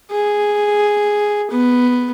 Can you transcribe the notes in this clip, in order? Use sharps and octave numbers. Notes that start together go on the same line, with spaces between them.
G#4
B3